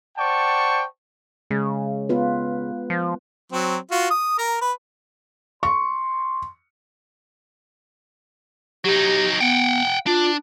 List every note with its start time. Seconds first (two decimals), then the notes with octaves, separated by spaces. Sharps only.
0.18 C5 D5 F#5 G5 A5 C#6
1.51 C#3 G#3
2.09 B3 F4 B4
2.90 F3
3.52 F#3 C4
3.91 F4 F#4
4.10 D#6
4.38 A#4 A#5
4.61 B4
5.63 C6 C#6
8.85 F#3 D#4 G4
9.40 B3 F#5 G5
10.06 D4 F4